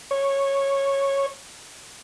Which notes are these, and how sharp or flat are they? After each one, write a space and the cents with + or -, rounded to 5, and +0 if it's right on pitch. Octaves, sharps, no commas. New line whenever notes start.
C#5 -10